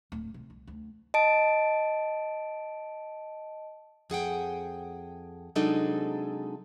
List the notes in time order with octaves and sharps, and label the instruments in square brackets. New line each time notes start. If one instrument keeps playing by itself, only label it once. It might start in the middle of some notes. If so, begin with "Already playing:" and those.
[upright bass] D1
C3
C2
D2
[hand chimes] D#5 A5 D7
[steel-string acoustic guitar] F2 G#4 F#5 G5
C3 F#3 G#3 D4 D#4 A4